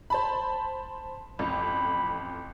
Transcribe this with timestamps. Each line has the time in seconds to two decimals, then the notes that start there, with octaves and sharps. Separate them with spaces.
0.10 C5 A5 B5
1.39 A1 F2 B5